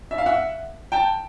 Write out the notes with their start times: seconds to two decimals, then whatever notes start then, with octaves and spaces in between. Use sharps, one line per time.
0.11 E5
0.18 F5
0.26 E5 F#5
0.92 G5 A5